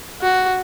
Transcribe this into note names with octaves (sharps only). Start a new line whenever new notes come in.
F#4